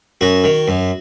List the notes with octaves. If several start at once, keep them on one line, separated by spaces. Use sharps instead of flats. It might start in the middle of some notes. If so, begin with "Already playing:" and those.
F#2 F#4
D#3
F#2